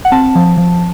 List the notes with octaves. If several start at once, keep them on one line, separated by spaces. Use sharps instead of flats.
F#5
C4 A5
F3
F3